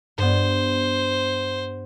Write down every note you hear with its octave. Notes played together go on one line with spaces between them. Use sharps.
G2 B3 C5